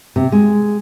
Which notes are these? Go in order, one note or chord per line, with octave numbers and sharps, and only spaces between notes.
C3
G#3